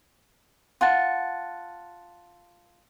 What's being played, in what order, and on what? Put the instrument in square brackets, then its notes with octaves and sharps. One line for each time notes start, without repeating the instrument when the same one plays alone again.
[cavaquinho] F4 F#5 A5